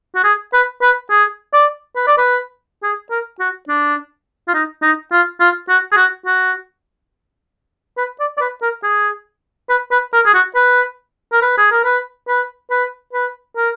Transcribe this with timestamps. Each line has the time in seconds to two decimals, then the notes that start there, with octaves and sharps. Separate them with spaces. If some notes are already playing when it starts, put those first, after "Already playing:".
0.15 F#4
0.24 G#4
0.53 B4
0.82 B4
1.11 G#4
1.53 D5
1.96 B4
2.08 D5
2.18 B4
2.83 G#4
3.11 A#4
3.40 F#4
3.69 D4
4.48 F4
4.54 D#4
4.82 D#4
5.12 F4
5.40 F4
5.69 F#4
5.92 G#4
5.97 F#4
6.26 F#4
7.97 B4
8.20 D5
8.37 D5
8.41 B4
8.62 A#4
8.83 G#4
9.69 B4
9.91 B4
10.14 A#4
10.26 G#4
10.35 F#4
10.56 B4
11.33 A#4
11.42 B4
11.58 G#4
11.72 A#4
11.85 B4
12.28 B4
12.71 B4
13.13 B4
13.57 A#4